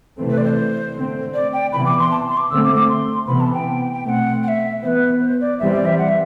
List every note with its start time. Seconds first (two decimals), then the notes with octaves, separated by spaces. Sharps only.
0.18 C3 E3 A3 C4
0.30 B4
0.37 D5
0.44 C5
0.95 D3 A3 C4
1.34 D5
1.53 G5
1.72 C3 E3 B3 B5
1.85 D6
1.99 C6
2.11 A5
2.29 C6
2.37 D6
2.50 D3 A3 C4 E6
2.64 D6
2.75 D6
2.89 C6
3.27 C3 E3 B3 B5
3.40 A5
3.53 G5
3.93 G5
4.04 B2 A3 C4 F#5 G5
4.43 F#5
4.48 E5
4.82 E3 B3 B4 C5
5.20 C5
5.41 D5
5.59 E3 G3 C4 E5
5.73 D5
5.85 E5
5.98 F#5
6.08 E5